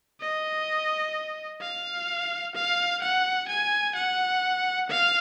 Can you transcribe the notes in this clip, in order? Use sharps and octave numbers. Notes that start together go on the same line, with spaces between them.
D#5
F5
F5
F#5
G#5
F#5
F5